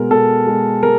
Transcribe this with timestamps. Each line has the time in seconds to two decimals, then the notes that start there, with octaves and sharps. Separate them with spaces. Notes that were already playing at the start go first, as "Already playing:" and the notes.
Already playing: B2 G#3 A#4
0.10 B2 A4
0.47 G#3
0.83 G#3 A#4